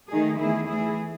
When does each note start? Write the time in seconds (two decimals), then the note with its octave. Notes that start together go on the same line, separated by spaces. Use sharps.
0.11 D#3 A3 D#4 G#4
0.39 E2 D#3 A3 E4 G#4
0.68 E3 A3 E4 G#4